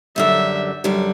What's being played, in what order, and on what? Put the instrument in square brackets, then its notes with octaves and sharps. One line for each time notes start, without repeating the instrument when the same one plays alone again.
[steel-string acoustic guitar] F#2 D3 G3 [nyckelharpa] E5
[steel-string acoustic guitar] F#2 D3 G3